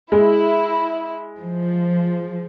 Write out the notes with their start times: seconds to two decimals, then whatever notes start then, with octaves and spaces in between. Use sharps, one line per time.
0.12 G#3 E4
1.39 F3